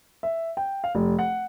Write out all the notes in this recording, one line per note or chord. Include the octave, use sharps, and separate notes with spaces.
E5
G5
F5
F1
F#5